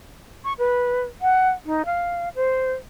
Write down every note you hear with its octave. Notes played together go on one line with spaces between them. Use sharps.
C#6
B4
F#5
D#4
F5
C5